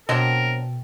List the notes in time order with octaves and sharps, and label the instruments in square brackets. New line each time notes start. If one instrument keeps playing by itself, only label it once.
[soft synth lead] B2 [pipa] F#3 C4 D4 [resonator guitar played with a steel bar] A4 D#5 G5 [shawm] A#4